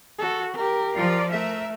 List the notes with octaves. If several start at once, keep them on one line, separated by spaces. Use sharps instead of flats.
F#4 A4
G4 A#4
F3 F4 D5
A3 A#4 E5